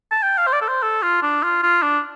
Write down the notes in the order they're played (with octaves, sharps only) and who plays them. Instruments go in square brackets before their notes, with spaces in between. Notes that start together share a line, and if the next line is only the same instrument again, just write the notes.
[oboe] A5
G5
F5
C5
D5
A4
C5
A4
F4
D4
F4
F4
D4